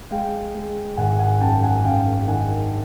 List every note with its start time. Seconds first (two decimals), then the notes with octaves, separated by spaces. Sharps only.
0.11 G#3 F5 G5
0.55 G#3
0.97 G#1 F#5 G#5
1.19 F#5 G#5
1.41 F#2 G5 A5
1.63 F#5 G#5
1.85 F#2 F5 G5
2.27 D#3 F#5 G#5